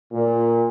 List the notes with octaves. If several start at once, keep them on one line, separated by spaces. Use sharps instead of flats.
A#2